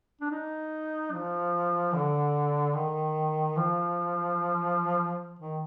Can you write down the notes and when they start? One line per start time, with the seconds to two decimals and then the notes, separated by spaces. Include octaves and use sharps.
0.21 D4
0.31 D#4
1.12 F3
1.93 D3
2.75 D#3
3.57 F3
5.39 D#3